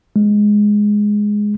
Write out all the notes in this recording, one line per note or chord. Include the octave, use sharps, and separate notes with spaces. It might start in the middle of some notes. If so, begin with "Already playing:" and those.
G#3